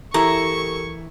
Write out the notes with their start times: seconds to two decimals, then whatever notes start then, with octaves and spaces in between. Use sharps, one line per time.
0.14 E3 E4 G4 A4 A#4 E5 A#5 C#6